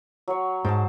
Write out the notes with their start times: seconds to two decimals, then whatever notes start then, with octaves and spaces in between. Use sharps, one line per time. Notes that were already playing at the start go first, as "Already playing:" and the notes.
0.28 F#3 C#5
0.65 G#2 C5 A5